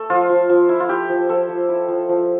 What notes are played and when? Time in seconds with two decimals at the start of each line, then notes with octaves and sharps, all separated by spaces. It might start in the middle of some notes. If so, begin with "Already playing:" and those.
Already playing: A3 A4
0.10 F3 F4
0.30 F3
0.49 F3
0.69 E4
0.80 F4
0.89 E4 G4
1.10 F3
1.29 F3 A4
1.49 F3
1.69 E4
1.89 F3
2.09 F3